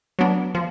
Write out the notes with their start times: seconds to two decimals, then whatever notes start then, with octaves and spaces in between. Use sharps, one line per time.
0.19 F#3 B3 D4
0.55 F3